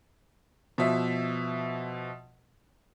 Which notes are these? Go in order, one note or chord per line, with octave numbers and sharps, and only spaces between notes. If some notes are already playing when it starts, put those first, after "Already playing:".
B2 F3 E5